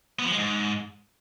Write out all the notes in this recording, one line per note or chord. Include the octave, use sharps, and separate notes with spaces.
B3
F3
G#3
G#2